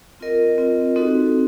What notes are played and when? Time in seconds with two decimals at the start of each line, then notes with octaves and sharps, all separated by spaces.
0.20 C4 F4 A#4 D#5
0.58 C4 F4 A#4 D#5
0.96 C4 D#4 F#4 A4